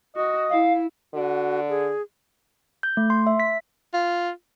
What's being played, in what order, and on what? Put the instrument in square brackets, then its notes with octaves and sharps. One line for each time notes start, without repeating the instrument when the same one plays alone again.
[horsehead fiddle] F#4 [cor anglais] D#5
[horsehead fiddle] E4 [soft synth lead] F5
[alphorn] D3 [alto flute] F#4
[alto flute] G#4
[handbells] G6
A3
C6
E5
B6
[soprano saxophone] F4